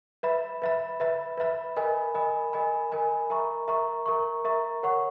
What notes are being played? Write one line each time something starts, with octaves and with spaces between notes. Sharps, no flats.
B4 E5 B5
B4 E5 B5
B4 E5 B5
B4 E5 B5
A#4 D#5 G#5 B5
A#4 D#5 G#5 B5
A#4 D#5 G#5 B5
A#4 D#5 G#5 B5
A#4 E5 A#5 C#6
A#4 E5 A#5 C#6
A#4 E5 A#5 C#6
A#4 E5 A#5 C#6
A#4 C#5 F#5 C#6